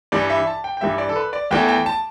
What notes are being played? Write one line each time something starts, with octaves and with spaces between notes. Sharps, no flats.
G2 E3 G3 D5
E5
A5
G5
G5
G2 E3 G3 E5
D5
A4
B4
D5
E2 E3 A3 G5
G5
A5